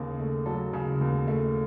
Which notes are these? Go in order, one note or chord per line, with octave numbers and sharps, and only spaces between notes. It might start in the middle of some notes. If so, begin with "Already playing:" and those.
Already playing: D#2 C#3 G#4
A3
F#3 A4
C#3
D#2
A3